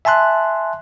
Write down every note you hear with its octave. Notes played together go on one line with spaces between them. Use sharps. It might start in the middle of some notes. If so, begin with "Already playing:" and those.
E5 G#5 A5 C6 F#6